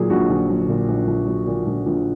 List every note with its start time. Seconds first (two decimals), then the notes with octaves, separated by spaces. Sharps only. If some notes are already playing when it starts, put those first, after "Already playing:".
Already playing: A#2 F#3 G#4
0.10 A#1 F#4
0.29 A#1
0.49 F#3
0.69 A#2
0.88 A#1
1.07 A#1
1.27 F#3
1.47 A#2
1.66 A#1
1.86 A#1